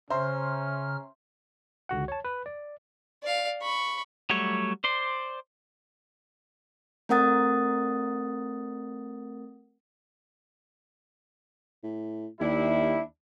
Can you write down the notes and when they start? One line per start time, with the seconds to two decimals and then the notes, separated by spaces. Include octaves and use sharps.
0.10 C#3 C#4 C5 E5 A#5 C6 F6
1.89 C#2 D3 F#4 F#5
2.08 C#5 A5
2.25 B4
2.46 D5
3.23 D5 F5
3.61 B5 C#6
4.30 F#3 G3 A3 C#5
4.84 C5 D5 C6
7.09 A3 C4 A#4 F#5 D#6 A6
11.84 A2
12.41 D#2 G3 D4 E4